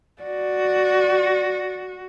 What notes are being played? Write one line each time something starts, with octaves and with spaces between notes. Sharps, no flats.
F#4 D5